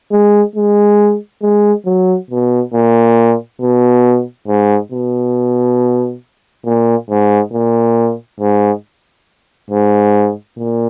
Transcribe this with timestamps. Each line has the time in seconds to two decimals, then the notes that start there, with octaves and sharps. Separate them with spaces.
0.12 G#3
0.56 G#3
1.42 G#3
1.86 F#3
2.31 B2
2.74 A#2
3.61 B2
4.48 G#2
4.92 B2
6.65 A#2
7.10 G#2
7.53 A#2
8.40 G#2
9.71 G#2
10.58 A#2